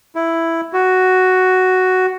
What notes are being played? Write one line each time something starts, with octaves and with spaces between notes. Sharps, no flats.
E4
F#4